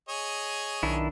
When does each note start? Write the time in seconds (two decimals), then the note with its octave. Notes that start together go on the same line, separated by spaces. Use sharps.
0.09 G#4 C#5 D#5
0.83 B1 D#3 D4 E4